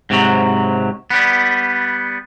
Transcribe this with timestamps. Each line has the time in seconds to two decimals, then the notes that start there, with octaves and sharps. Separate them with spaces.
0.10 G#2 C3 F#3
1.10 G3 B3